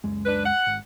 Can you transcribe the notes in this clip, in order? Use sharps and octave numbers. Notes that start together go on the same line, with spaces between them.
C#2 F#2 G#3
D4 B4
F#5
G#1